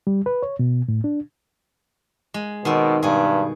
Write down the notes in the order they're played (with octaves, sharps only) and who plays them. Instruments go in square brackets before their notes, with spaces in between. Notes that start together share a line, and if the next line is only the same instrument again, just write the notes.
[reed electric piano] G3
B4
C#5
B2
A2
D4
[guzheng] G#3
[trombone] B2 [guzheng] D#3 C4
[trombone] G2 [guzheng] B2 G#4